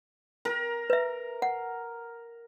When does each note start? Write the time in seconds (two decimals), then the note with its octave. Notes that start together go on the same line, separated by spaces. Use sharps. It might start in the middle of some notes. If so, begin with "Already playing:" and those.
0.45 A#4
0.90 B4 E5
1.42 F#5